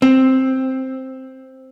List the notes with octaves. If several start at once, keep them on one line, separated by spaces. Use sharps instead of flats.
C4